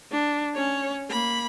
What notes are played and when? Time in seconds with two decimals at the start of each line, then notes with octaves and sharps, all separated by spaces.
0.12 D4
0.55 C#4 C#5
1.10 A#3 B5